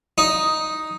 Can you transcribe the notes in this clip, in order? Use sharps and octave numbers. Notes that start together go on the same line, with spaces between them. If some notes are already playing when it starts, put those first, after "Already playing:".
D#4